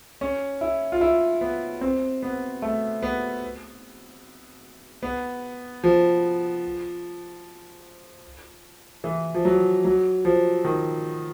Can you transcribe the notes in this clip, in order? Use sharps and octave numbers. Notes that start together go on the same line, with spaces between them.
C#4
E4
F4
E4
B3
C4
B3
A3
B3
B3
F3
E3
F3
F#3
F#3
F3
D#3